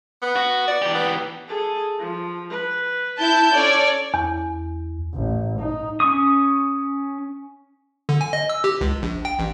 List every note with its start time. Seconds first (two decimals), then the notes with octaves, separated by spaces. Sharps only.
0.22 B3
0.36 F#4
0.67 D5
0.82 E3 G4
0.95 B3
1.47 G#4 A4
1.99 F3
2.50 B4
3.19 E4 A5 G6
3.54 C#4 A4 C#5 D5
4.14 E2
5.14 A1
5.60 D#4
6.00 C#4 C#6 D#6
8.09 D3
8.21 G#5
8.33 D#5
8.49 E6
8.64 G4
8.81 C#2
9.02 A#1
9.25 G5
9.39 A1